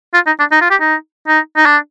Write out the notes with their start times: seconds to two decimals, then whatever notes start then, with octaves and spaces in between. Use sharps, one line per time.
0.14 F4
0.26 D#4
0.39 D4
0.51 D#4
0.61 F4
0.70 G4
0.81 D#4
1.27 D#4
1.57 D#4
1.66 D4